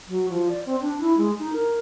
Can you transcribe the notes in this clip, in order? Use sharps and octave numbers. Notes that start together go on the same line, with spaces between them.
F#3
F3
D5
C4
D4
E4
G#3
D#4
A#4